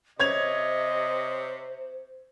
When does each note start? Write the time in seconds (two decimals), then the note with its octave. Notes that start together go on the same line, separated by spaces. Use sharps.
0.19 C3 C5 C#5 D#5 G#6 F7